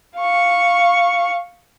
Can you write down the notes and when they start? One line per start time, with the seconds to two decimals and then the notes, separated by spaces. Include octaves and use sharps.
0.18 F5 C#6